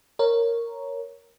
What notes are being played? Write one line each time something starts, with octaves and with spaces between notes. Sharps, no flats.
A#4 C#5